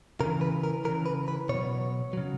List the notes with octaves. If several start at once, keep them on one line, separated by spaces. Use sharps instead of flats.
C#3 E3 A#4
B4
A#4
C#3 E3 A#4
B4
B4
B2 F#3 C#5
C#3 F#3